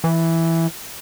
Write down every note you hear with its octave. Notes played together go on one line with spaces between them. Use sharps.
E3